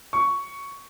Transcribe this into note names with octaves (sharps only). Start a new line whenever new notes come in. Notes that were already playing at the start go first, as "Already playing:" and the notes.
C#6